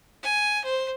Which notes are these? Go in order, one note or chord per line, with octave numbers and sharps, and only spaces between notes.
G#5
C5